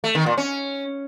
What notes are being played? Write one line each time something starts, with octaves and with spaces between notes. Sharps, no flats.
A3
D#3
A#2
C#4